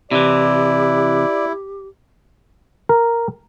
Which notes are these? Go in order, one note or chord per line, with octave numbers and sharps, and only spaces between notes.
C3 E3 E4 G4 D5
A#4